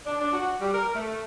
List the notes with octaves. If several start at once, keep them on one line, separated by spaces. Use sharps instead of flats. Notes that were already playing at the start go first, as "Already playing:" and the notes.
D4
D4
F#4
G3
A#4
A3